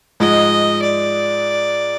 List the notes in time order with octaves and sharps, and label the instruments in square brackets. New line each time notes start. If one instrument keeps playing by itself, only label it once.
[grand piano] G#2 F3 G#3 [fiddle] D#5
[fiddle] D5